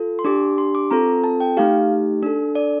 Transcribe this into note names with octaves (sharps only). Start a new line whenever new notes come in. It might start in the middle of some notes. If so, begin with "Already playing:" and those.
Already playing: F4 A4
C6
D4 G4 D6
C6
D6
C4 F4 A4 A#5
A5
G5
A3 D#4 G4 F5
D4 A4
D5